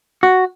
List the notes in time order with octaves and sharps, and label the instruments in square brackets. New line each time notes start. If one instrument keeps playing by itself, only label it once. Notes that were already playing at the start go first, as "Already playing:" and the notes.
[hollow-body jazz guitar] F#4